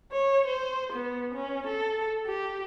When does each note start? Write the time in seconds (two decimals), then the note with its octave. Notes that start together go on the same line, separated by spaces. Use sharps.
0.13 C#5
0.47 C5
0.93 B3
1.35 C#4
1.68 A4
2.27 G4